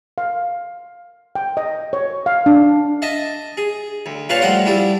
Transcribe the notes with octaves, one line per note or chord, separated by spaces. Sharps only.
F5
G5
D#5
C#5
F5
D4
D#5 E5 A5
G#4
D2
A#2 F4 B4 C#5 F5 A5
A2 F3 G3 F#5 G5 C6
G3 D4 E4 G4